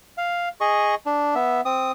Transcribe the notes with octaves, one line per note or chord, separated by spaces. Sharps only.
F5
G#4 D#5 C#6
D4
B3 E5
C4 D#6